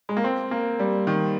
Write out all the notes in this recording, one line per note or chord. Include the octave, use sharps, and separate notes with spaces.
G#3
A#3
C4
A#3
G3
D#3